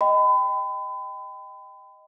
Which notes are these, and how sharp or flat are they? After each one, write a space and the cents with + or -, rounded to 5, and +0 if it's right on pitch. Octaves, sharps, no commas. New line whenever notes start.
D#5 +0 G5 +0 B5 +35